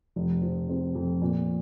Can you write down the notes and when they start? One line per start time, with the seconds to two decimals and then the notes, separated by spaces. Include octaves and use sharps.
0.16 F1
0.42 F3
0.69 C4
0.95 F2
1.22 A#2